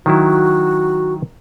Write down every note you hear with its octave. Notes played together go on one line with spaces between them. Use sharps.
D#3 F#3 E4 F#4